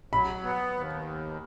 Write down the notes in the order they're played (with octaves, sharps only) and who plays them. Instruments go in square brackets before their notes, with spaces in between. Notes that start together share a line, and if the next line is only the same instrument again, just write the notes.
[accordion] F#3 [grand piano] B5
[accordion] B3
D#2